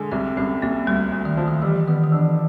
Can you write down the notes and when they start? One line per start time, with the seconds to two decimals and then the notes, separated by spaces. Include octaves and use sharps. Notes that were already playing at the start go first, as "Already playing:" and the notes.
Already playing: D3 G#3
0.12 C2 C4
0.37 C2 C#4
0.62 C2 A#3
0.87 D2 G3
1.12 D2
1.25 D#3
1.37 F3
1.48 D#3
1.62 E3 G3
1.88 D#3 B3
2.04 D#3
2.12 E3 D4